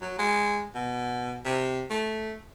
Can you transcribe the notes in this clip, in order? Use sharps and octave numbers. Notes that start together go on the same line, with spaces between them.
F#3
G#3
B2
C3
A3